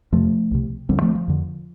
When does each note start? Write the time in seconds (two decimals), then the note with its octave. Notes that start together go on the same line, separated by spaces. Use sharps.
0.12 F2 C3 F3 A3
0.51 C2 C3
0.89 D2 D3 G3 C4
1.02 F3 A3
1.15 F3
1.28 F2 D3